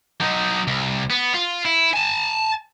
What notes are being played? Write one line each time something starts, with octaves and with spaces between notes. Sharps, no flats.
F#3 D#4
C2
B3
F4
E4
G#5 A5